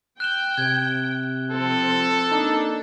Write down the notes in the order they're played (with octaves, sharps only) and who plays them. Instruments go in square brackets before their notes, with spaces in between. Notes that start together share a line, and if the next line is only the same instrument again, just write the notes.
[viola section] G5 [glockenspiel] F#6 E7 G7
[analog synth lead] C3 [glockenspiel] G#6
[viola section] F3 C4 [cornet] A4
[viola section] A#3 D4 [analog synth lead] D#4